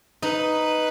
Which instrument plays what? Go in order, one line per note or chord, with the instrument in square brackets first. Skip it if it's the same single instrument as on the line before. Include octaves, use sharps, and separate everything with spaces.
[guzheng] D#4 [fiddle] B4